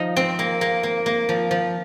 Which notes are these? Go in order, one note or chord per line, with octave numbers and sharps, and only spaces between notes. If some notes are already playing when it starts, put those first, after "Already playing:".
Already playing: F3 D#4
C4
A#3
A#3
A#3
A#3
F3
F3